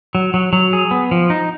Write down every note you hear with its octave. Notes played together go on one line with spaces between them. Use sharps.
F#3
F#3
F#3
G#4
B3
F3
D#4